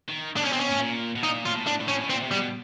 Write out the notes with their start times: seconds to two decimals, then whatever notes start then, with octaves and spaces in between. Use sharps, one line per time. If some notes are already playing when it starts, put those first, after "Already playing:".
0.09 D#3
0.37 B2 D4
0.44 C#4
0.53 C4
0.60 C#4
0.71 A2
0.80 A#2
1.16 B2
1.23 A#2 D#4
1.45 A#2 F4
1.53 A2
1.67 D4
1.80 A2
1.88 C#4
2.02 B2
2.09 A#2 C4
2.23 C3
2.31 B2 G3